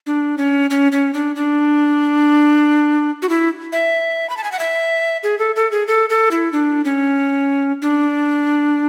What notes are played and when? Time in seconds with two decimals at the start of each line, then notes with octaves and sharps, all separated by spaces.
0.06 D4
0.38 C#4
0.70 C#4
0.92 C#4
1.13 D4
1.36 D4
3.22 F#4
3.29 E4
3.72 E5
4.30 B5
4.37 A5
4.44 G#5
4.52 F#5
4.59 E5
5.23 G#4
5.39 A4
5.56 A4
5.72 G#4
5.88 A4
6.10 A4
6.31 E4
6.52 D4
6.85 C#4
7.82 D4